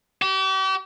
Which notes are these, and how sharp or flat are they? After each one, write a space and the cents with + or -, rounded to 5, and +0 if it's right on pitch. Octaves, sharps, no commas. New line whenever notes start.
G4 -40